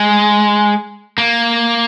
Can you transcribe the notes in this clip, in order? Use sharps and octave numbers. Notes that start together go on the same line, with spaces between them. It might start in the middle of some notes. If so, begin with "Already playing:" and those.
Already playing: G#3
A#3